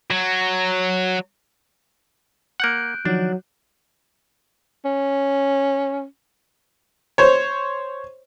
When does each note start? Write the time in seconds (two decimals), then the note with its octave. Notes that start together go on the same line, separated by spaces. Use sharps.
0.10 F#3
2.60 A#3 F#5 F#6 G6 D7
3.05 D#3 F3 F#3 D4 D#4
4.85 C#4
7.18 C5 C#5